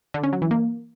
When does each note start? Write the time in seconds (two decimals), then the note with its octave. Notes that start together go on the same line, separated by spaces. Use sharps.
0.14 D3
0.23 C#4
0.33 F#3
0.42 E3
0.51 A#3